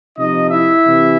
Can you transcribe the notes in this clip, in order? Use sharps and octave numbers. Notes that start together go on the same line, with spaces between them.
C3 F3 D#4 D#5
E4 E5
C3 E3